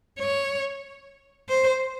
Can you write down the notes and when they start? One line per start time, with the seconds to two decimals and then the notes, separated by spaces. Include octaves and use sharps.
0.19 C#5
1.49 C5